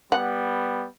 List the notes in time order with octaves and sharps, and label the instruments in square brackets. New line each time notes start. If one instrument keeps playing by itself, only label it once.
[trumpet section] G3 B3 [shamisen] F#5